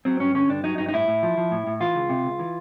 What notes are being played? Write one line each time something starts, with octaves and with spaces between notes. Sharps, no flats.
F#3 C4
G2 C#4
D3 C#4
G2 D4
F#3 D#4
G2 D#4
D#4
A2 E4
A2
F3
F3
A2
A2
E3 F4
C#2
C3
C#2
E3